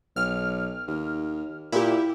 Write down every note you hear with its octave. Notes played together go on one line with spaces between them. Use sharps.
B1 F6
D#2
A#2 E4 G4